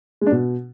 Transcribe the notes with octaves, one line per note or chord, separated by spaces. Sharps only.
G#3
D4
B2